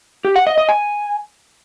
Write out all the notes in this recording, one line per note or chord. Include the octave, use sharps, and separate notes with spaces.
G4
F#5
D#5
D#5
G#5